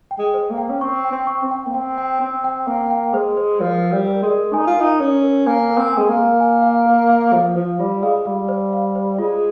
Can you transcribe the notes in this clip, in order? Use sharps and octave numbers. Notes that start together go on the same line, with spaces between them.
G5
G#3
C5
A#3
G5
C#4
C4 C#6
G5
C4
C#6
C4
G5
A#3
C4 G5
G5
C4 C5
G5
A#3 G5
G5
G#3 C5
C5
F3 A#4
A#4
G3
A#4
G#3
A#4
D#4 G#5
F4
D#4 A#4
C#4 A#4
A#4
A#3 G#5
A#4
C4
G#3 G#5
A#3
A#4
G#5
F5
A#4
F5
F3 F5
F3 C5
G3 F4
G#3 F5
G3 F5
C5
F5
C5
G#3 F4